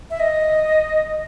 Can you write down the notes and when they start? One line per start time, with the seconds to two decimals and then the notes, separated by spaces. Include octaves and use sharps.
0.10 E5
0.20 D#5